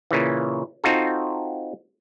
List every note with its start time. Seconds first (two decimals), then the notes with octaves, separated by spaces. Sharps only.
0.11 A#2 C#3 E3
0.84 C4 D#4 F4 F#4 A4